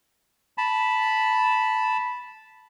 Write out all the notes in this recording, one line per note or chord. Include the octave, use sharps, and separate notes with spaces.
A5 B5